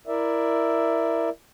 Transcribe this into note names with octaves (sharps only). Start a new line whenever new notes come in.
E4 A#4 D5 E5